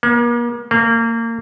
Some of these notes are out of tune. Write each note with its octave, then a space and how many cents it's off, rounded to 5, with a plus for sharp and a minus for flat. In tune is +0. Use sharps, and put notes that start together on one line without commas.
A#3 +40
A#3 -25